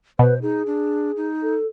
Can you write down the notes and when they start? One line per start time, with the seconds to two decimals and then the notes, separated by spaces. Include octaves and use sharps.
0.19 B2 B4 C5
0.42 D#4 G#4
0.67 D4
1.17 D#4
1.42 A4